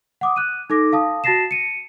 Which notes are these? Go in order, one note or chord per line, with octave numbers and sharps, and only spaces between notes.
F#5 D6 D#6
F#6 D#7
D#4 A4 D6 A#6
F5 A5 D#6
F#4 A5 A6 A#6 C7 E7
C#7 D#7